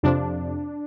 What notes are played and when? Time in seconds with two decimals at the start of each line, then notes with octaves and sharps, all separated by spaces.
0.03 F2 C3 F3 D4